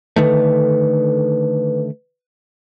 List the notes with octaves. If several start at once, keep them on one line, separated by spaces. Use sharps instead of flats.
D3 D#3 A3 B4